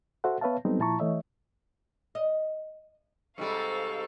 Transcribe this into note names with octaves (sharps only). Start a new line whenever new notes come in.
F#4 A4 C5 E5 F#5
B3 B4 C#5 E5 F5 A5
F#3 G3 B3 C4 D#4 A4
A#2 F3 E4 A5 A#5 C#6
E3 A3 C#5 D#5 E5
D#5
G#2 C3 G3 A4 F5 C#6